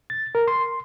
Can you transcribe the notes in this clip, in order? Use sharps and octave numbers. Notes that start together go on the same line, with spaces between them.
A6
A#4
C6